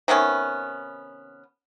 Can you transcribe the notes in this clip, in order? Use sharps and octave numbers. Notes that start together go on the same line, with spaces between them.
C3 D#3 B3 C#4